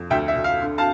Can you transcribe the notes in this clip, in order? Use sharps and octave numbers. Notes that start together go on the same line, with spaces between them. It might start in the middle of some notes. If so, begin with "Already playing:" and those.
Already playing: F2
D2 E5 G5
E5
D2
F5
D3
F5 A5